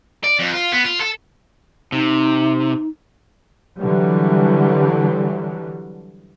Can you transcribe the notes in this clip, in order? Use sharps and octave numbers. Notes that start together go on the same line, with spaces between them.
D5
F2
F4
B3
F4
A4
C3 D#4
D3 E3 F#3 G3